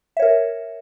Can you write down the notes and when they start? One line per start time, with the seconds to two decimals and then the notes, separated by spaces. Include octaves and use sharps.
0.17 E5
0.19 C#5
0.22 A#4